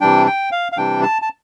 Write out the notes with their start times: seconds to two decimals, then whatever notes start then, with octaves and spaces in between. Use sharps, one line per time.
0.01 C3 E3 G3 D4 G5
0.26 G5
0.52 F5
0.72 F5
0.77 C3 E3 G3 D4 G5
1.03 A5
1.22 A5